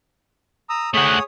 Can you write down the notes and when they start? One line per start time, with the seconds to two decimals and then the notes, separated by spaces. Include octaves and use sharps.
0.70 A#5 D#6 E6
0.94 A3 G#4 C#5 F#5 D#6